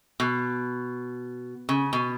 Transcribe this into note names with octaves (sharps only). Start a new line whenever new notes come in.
B2
C#3
B2